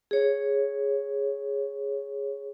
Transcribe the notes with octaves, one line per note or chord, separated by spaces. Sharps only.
G#4 C#5